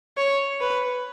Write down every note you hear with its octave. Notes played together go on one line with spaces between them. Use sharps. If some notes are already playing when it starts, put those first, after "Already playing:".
C#5
B4